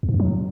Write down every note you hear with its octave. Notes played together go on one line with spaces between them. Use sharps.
E2
G#2
F2
F#3